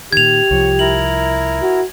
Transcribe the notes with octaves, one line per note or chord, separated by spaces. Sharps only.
A#2 D#3 G4 G#6 F7
C2 F3 C#5
E4 A#4 F#7
F#4